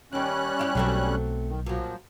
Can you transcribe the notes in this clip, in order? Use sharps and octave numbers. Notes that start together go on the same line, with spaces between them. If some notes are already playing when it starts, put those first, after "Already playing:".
D#2 D#3 G3 C#4 F#6
E4 F4 G4
B1 F#3 A3 C4
D#3
A#2 F3 F#3